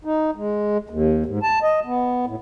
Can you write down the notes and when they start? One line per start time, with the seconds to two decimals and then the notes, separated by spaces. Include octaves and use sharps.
0.05 D#4
0.36 G#3
0.90 D#2
1.26 G#2
1.43 A5
1.63 D#5
1.85 B3
2.26 A2